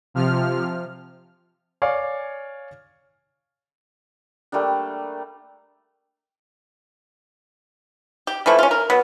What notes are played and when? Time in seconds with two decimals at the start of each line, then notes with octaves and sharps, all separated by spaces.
0.14 C3 F3 F6
1.82 C#5 D5 F5 G#5
4.52 G3 A3 A#3 D4
8.27 G4
8.46 E3 F3 A3 E4
8.59 C#4 F4
8.71 A#4
8.90 F#3 B3